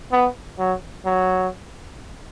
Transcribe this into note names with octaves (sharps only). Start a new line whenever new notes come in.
B3
F#3
F#3